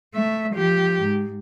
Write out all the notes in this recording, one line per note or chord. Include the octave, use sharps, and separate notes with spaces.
A3 E5
F3 G4
G#2